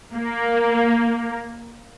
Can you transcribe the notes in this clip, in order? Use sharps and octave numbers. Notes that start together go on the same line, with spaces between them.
A#3